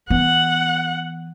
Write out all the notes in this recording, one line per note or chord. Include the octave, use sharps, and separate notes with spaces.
E3 B3 F#5